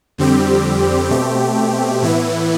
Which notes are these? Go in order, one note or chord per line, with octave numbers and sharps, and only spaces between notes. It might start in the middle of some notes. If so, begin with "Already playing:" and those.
F2 D3 G3 C4 G4
B2 A3 C4 G4
A2 E3 B3 E4